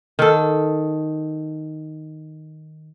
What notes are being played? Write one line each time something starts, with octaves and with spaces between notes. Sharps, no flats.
D#3 A4